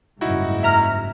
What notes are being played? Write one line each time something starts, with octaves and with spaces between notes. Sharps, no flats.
F#1 G#2 G3 D#4 E4 F#4
E5 A#5 F6